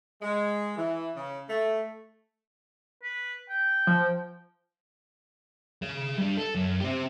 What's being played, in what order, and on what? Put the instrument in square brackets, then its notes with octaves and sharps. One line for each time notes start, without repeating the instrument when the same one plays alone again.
[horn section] G#3
E3
C#3
A3
[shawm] B4
G5
[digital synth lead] F3
[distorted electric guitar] G#4 F5
G3 D4
A4
F#2
C4 G4